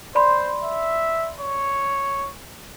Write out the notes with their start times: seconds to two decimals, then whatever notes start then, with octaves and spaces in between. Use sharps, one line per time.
0.15 C5 D5 B5 C6
0.63 E5
1.40 C#5